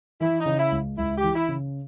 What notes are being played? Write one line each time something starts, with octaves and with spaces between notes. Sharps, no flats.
E3 E4
D#4
C#3
E4
C#2
C#2 E4
G4
E3
E4
C#3